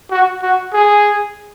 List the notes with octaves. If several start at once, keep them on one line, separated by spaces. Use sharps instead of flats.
F#4
F#4
G#4